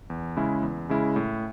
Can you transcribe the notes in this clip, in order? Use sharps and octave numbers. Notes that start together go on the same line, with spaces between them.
E2
C#3 G#3 C#4 E4
E2
C#3 G#3 C#4 E4
A2